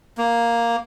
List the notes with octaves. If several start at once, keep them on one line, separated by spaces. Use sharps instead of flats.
A#3